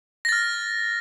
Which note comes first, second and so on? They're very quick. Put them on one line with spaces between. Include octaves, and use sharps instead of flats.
A#6 A6 F6